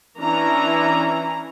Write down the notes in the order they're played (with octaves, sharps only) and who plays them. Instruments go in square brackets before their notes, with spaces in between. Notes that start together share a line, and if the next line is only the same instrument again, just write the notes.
[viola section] E3 C#4 D4 E4 A#5